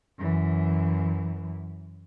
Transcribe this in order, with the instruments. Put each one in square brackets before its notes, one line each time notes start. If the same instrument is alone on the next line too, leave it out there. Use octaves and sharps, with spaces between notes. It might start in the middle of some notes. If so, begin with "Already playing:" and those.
[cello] F#2 E3